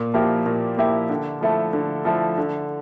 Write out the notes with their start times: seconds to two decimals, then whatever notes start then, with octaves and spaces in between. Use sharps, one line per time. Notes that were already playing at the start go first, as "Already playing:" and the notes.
Already playing: A#2
0.14 F3 A#3 E4 G4
0.46 A#2
0.77 F3 A#3 E4 G4
1.09 D3
1.41 F3 A3 E4 A4
1.73 D3
2.05 F3 A3 E4 A4
2.38 D3